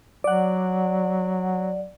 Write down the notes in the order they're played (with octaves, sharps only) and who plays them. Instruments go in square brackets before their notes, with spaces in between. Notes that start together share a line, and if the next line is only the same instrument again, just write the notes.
[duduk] F#3 [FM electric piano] D5 F#5